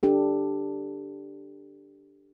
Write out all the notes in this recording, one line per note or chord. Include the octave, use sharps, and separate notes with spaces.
D4 G4 A4